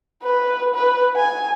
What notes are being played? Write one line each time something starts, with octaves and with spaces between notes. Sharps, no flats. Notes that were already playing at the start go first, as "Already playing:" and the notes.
B4
B4
G#5